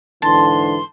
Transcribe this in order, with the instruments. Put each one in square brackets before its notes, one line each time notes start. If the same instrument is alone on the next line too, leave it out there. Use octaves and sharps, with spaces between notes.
[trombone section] G#2 D3 E3 [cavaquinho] A5 [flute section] C6